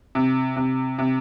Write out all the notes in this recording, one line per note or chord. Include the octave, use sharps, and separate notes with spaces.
C3
C3
C3